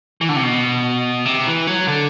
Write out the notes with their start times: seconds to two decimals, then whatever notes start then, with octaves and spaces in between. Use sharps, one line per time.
0.21 E3
0.29 D3
0.36 C3
0.43 B2
1.25 C3
1.47 E3
1.67 F#3
1.88 D3